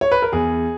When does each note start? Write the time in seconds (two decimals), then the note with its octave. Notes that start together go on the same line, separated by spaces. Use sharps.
0.01 C#5
0.12 B4
0.22 A#4
0.32 E2 G#4